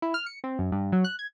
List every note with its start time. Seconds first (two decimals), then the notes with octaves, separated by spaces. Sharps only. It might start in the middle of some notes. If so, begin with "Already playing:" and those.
0.02 E4
0.14 F6
0.26 C#7
0.44 C4
0.59 F#2
0.72 G2
0.92 F#3
1.04 F#6
1.19 G#6